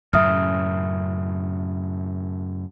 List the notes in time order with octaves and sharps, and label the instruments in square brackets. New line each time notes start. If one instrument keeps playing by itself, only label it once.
[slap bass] F#2 A2 C#3 [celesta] E5 D#6 F6